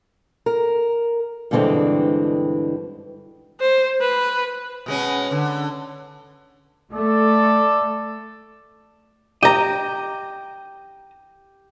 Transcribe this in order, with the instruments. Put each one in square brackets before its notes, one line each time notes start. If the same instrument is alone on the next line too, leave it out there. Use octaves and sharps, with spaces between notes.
[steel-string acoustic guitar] A#4
G2 B2 D3 E3 G#3 C4
[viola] C5
B4
[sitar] B2 G#3 C#4
D3
[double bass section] A3 [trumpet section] A4 D5
[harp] G4 [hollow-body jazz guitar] D#5 A#5